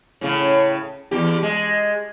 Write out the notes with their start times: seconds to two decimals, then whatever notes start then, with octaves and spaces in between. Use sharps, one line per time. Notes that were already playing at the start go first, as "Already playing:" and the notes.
0.21 A2 C#3
1.11 E2 G4
1.42 G#3